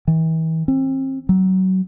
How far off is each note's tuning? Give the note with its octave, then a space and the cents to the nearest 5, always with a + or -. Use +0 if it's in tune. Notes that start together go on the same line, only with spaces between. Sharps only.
E3 -40
C4 +30
F#3 +25